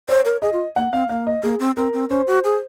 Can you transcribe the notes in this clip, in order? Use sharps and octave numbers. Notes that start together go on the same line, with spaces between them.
C5 C#5
A#4
G#4 D#5
F4
A#3 F#5
C4 F5
A#3 F5
D#5
A#3 G#4
C4
C4 A#4
C4
C#4 C5
F#4
G#4